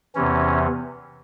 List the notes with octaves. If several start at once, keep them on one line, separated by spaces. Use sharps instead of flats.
E2 C3 E3 C#4